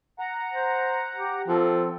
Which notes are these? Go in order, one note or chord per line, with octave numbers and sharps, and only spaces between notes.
F#5 A#5
C5
G4
F3 C4 A4